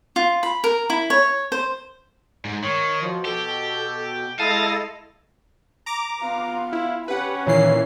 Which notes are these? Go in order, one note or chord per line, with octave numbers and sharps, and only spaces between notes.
F4
B5
A#4
E4
C#5
C5
G#2
D#3 C#5
B2 F3
G4 A4
G#3 E4 A4 D#5 F5 A5 D#6 A6
A#5 D6
B3 F4 F5
E4
C#4 G4 B4 F#5
A#2 D#3 E3 C#5 C7